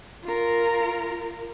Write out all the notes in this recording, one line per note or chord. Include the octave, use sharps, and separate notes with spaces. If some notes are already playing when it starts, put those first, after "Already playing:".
F4 A#4